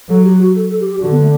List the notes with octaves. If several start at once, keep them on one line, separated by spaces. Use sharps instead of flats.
F#3 A4
G4
F#4
A4
A4
G4
G4
D3 F#4
B3
A3